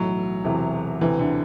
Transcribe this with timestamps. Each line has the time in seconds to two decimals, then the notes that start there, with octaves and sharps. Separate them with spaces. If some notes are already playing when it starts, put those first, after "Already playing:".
Already playing: B1 A2 E3 F#3 A3
0.44 E1 E2 C3 E3
1.00 E1 D2 C3 E3
1.19 D3